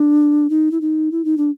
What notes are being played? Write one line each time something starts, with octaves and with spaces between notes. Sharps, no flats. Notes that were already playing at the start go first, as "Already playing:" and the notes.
Already playing: D4
D#4
E4
D#4
E4
D#4
D4